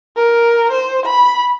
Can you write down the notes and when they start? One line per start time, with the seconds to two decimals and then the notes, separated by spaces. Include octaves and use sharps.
0.16 A#4
0.72 C5
1.06 B5